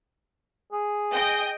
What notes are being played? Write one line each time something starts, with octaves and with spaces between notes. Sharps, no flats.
G#4
D#5 G5 G6